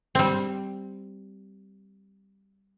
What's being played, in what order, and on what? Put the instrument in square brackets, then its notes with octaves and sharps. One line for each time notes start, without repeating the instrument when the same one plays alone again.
[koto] G3 C4